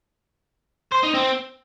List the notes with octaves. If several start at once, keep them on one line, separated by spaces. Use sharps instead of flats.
C5
D#4
C4